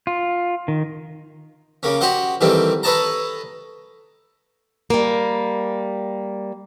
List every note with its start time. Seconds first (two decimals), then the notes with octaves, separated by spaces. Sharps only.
0.07 F4
0.68 D#3
1.83 C#3 A#3 C#4
2.01 F#4 G4 C5 D#5 F#5
2.41 D#3 E3 G3 A3 C4
2.83 A4 B4 C#5 D#5 A5 A#5
4.90 G3 A#3